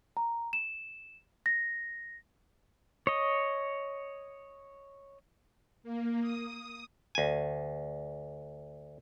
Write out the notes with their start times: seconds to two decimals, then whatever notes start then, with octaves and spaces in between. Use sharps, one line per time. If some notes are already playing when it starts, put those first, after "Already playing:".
0.17 A#5
0.53 E7
1.46 A#6
3.07 C#5 D#5
5.83 A#3
6.21 D#6
7.15 D2 G#5